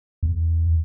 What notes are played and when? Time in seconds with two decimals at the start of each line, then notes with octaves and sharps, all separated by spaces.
0.23 E2